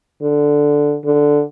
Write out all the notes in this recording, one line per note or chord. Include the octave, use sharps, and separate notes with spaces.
D3
D3